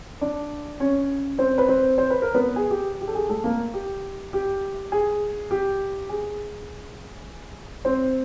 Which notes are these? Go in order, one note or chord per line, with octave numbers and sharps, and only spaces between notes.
D4 D5
C#4 C#5
C4 C5
B4
C4 C5
C5
B4
A#4
B3 B4
G#4
G4
G4
A4
G#4
A3 A4
A#3 A#4
G4
G4
G#4
G4
G#4
C4 C5